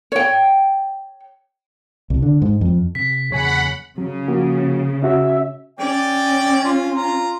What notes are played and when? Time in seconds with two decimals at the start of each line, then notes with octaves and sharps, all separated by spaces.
0.12 C#5 G5
2.10 C2
2.22 D3
2.42 G#2
2.61 F2
2.95 C3 B6
3.30 E2 C#3 F#3 A#3 C#5 F#5 G#5 B5
3.98 C#3 F#3
4.28 F3 A#3 F#4
5.03 C#4 F#4 E5
5.79 C#4 D5 G5
6.65 F4
6.96 F4 A#5